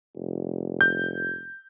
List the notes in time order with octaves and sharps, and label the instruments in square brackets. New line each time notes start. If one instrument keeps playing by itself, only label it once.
[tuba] F1
[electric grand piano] G6